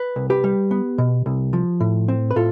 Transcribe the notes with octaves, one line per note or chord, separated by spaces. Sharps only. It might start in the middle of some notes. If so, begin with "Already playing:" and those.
Already playing: B4
C2
G4 B4
G3
B3
B2
C2
F3
A2
C4
B4
A2 F4 A4